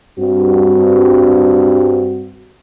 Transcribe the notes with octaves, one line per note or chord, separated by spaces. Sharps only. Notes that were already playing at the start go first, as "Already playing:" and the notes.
G2 C4 F#4